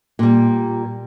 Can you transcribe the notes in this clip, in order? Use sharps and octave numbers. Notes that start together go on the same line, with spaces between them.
A#2 G3